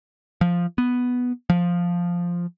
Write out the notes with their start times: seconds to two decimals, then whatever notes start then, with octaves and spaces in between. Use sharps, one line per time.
0.41 F3
0.78 B3
1.50 F3